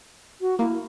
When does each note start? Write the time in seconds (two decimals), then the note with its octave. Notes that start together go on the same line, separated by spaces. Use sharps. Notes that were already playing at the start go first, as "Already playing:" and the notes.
0.41 F#4
0.59 A#3 E4